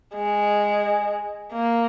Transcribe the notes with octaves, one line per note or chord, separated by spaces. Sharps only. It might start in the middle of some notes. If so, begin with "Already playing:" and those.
G#3
A#3